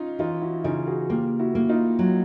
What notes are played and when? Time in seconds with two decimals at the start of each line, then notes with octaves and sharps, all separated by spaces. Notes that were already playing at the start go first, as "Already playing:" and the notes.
Already playing: C#4 D#4 F4
0.19 E3 D#4 F4
0.41 E4 F#4
0.64 C#3 D#4 F4
0.87 F#4 G#4
1.09 A#3 F4 G4
1.39 E4 F#4
1.55 A#3
1.69 D#4 F4
1.99 F#3